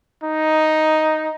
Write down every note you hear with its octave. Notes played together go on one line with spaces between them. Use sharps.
D#4